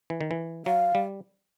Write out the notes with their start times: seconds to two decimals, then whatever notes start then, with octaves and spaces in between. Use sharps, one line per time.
0.10 E3
0.21 D#3
0.31 E3
0.66 F#3 F5
0.95 G3